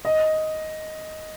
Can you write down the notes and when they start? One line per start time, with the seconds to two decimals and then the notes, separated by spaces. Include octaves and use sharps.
0.05 D#5